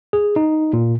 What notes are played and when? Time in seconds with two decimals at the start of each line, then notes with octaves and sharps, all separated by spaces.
0.13 G#4
0.36 D#4
0.73 A#2